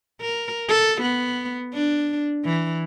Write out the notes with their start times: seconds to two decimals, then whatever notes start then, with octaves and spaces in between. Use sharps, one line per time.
0.21 A#4
0.69 A4
1.01 B3
1.74 D4
2.45 E3